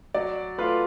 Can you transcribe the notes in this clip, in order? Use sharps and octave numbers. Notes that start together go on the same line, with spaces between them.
F#3 D5
A3 F4 B4 F5